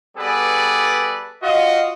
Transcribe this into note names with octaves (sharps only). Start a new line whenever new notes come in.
G3 B3 G#4 A4 B4 D5
F4 F#4 D#5